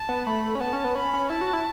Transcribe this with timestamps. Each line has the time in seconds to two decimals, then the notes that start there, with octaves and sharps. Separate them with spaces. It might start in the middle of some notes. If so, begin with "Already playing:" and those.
Already playing: A5
0.09 B3
0.27 A3 B5
0.55 C#4
0.60 B3 A5
0.73 C#4
0.84 B3
0.95 C#4 B5
1.13 C#4
1.30 E4 A5
1.41 F#4
1.53 E4